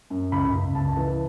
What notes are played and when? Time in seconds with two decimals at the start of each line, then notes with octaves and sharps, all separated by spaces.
0.10 F#2
0.32 C#2 B5
0.53 C#2
0.75 C#2 A5
0.97 E3